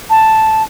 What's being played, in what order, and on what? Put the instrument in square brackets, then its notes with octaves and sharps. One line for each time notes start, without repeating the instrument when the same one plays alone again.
[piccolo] A5